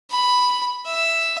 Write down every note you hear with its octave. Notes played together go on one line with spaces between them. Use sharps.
B5
E5